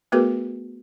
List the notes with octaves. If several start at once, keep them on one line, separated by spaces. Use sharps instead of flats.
A3 B3 F#4 G#4 A#4 B4